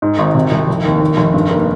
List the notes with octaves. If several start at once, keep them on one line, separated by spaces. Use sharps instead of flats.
G#2
G#1
C3
C2
F1
D#2
D#2
F1
G2
A#3